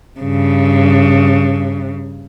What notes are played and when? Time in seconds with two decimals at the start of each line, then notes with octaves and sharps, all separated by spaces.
0.20 G2 C#3